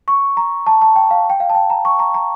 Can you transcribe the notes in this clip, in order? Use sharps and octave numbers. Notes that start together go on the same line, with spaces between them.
C#6
A#5
A5
A5
G5
F5
G5
F5
A5
G5
A#5
C#6
A#5
A#5